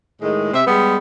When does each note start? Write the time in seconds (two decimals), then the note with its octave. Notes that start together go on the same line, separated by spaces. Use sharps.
0.21 A2 D#3 G#3
0.53 C3 C4 G4 E5
0.66 G3 G#3 B3